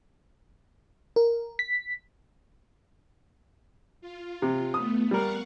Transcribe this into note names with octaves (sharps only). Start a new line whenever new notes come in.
A#4
B6
F4
C3
A3 B3 D#6
G3 A#4 F5 F#5 C#6